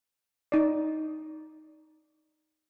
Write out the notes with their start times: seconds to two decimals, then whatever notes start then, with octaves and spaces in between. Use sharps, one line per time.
0.52 D#4 D5